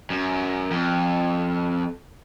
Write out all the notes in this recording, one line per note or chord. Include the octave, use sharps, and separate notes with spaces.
F#2
F2